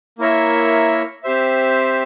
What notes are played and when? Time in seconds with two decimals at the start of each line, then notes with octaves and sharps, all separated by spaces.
0.19 A#3 E4 A#4 C#5 E5
1.23 C4 G4 C5 E5